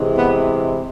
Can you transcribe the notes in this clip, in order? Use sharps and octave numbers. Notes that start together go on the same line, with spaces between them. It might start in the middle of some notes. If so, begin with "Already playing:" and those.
Already playing: C3 E3 G#3
B3